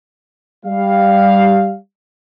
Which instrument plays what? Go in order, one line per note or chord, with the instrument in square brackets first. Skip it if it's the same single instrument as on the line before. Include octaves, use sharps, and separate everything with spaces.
[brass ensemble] G3 F5